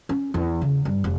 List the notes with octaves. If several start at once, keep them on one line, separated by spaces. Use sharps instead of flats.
C#4
E2
C#3
G2
F1